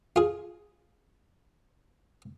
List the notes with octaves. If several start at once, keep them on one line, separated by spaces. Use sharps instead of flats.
F4 G#4